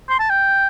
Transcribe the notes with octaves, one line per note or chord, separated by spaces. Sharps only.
C6
A5
G5